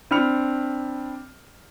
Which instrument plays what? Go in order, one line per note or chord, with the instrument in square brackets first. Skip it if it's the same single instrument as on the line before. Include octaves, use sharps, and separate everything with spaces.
[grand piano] C4 D4 B5 F6 C#7 F7